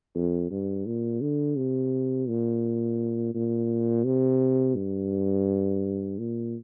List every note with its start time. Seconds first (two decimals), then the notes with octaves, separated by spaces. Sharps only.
0.15 F2
0.50 G2
0.86 A#2
1.22 D3
1.56 C3
2.29 A#2
3.34 A#2
4.05 C3
4.76 G2
6.19 A#2